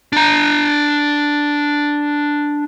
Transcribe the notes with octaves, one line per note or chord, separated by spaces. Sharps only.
D4 A#5